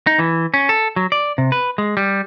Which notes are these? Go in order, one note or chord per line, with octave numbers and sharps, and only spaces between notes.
D#4
E3
C#4
A4
F#3
D5
C3
B4
G#3
G3